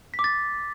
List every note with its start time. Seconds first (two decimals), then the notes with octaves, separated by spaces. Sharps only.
0.14 B6
0.19 D6
0.24 A6